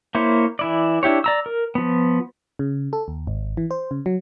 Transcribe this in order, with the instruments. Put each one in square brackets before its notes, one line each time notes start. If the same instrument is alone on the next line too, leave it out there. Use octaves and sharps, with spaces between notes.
[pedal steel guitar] A#3 E4 C5 C#5
E3 E4 D5
D4 E4 G4 C#5
D5 A#5 E6
A#4
F3 B3
[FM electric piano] C#3
A4
D#2
G#1
E3
C5
C#3
F#3